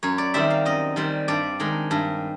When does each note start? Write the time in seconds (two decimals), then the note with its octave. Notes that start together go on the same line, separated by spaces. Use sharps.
0.03 F#2 C#5
0.18 D5
0.34 D#3 G3 C4 E5
0.50 F5
0.65 F#2 D#5
0.96 D#3 G3 C4
1.28 G2 D5
1.60 D#3 G#3
1.91 G2